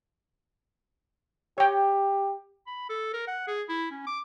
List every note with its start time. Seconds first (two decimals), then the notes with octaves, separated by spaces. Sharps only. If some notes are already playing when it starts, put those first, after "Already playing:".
1.58 G4 C#5 G5
2.67 B5
2.90 A4
3.14 A#4
3.28 F#5
3.47 G#4
3.69 E4
3.91 C#4
4.07 D6